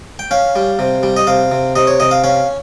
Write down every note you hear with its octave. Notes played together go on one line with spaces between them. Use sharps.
G5
C#4 F5
G3
C3
G3
D#5
C3 F5
C3
C3 D#5
C#5
C3 D#5
F5
C#4 F5